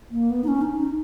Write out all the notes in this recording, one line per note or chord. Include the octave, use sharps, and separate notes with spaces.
A#3
B3
D#4
C#4
D#4
D#4